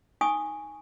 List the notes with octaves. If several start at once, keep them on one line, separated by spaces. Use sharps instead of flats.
D#4 G#5 C#6 D#6